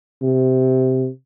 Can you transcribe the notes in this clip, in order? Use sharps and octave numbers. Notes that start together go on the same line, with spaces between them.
C3